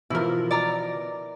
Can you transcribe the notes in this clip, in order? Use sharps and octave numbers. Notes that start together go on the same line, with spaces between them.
B2 E3 F3 E4 A#4
D5 A#5